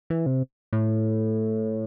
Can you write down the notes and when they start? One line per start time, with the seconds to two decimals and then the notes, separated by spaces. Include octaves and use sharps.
0.10 E3
0.26 C3
0.73 A2